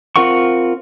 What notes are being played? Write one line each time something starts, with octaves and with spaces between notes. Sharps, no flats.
C4 F4 A#4 F#5 C#6